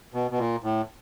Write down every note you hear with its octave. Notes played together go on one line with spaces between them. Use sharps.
B2
B2
A#2
A2